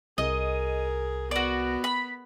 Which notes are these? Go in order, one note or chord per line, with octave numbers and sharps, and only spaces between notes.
C2 G#4 A#4 D#5
B3 F#4 D5
B5